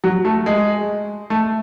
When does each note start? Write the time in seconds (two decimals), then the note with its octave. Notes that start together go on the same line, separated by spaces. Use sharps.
0.04 F#3
0.25 A3
0.46 G#3
1.30 A3